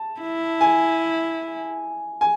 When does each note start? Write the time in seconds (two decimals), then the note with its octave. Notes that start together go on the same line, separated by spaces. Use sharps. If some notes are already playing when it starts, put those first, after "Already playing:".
Already playing: A5
0.21 E4
0.61 G#5
2.21 G#5